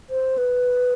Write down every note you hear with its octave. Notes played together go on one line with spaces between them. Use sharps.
C5
B4